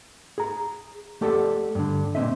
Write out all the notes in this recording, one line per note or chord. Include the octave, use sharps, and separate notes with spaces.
G#4 A#5
A3 G4 A4 D5 F#5
G2 D3
A#2 C#3 C4 D#5 E5